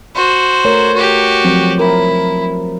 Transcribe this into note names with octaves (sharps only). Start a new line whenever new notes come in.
F#4 C5
A3 A#4 C#5
F#4 G4
F3 F#3 C4
E4 A#4